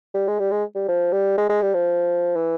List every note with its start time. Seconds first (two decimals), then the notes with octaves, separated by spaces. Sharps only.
0.14 G3
0.28 G#3
0.39 G3
0.51 G#3
0.75 G3
0.88 F3
1.12 G3
1.38 G#3
1.49 G#3
1.62 G3
1.74 F3
2.36 E3